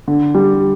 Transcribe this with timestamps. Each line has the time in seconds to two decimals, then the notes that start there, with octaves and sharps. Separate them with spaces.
0.08 D3
0.35 G3